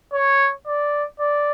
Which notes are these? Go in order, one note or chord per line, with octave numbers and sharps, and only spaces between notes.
C#5
D5
D5